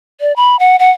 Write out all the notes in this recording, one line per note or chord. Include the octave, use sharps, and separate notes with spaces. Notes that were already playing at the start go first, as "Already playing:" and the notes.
D5
B5
F#5
F#5